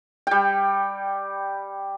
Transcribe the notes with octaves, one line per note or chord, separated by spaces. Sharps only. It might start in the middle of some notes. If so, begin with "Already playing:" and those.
G3 G5